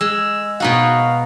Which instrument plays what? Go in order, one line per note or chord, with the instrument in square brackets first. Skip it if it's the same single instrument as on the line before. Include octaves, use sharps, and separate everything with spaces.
[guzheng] G#3 [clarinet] E6
[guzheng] B2 D#4 F#4 [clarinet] F5